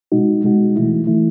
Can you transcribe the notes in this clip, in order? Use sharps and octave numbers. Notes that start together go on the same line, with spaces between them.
B2 G#3 D#4 F#4
B2 G#3 D#4 F#4
E3 A3 E4
E3 A3 E4